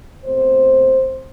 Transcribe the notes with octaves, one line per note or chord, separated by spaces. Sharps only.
B2 A3 C4 C5